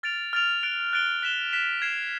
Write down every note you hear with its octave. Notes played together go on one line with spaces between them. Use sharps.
F6 A6 D7 F7
F6 A6 D7 F7
F#6 A6 D7 G7
F#6 A6 D7 G7
F#6 B6 E7 G7
F#6 B6 E7 G7
G#6 C7 E7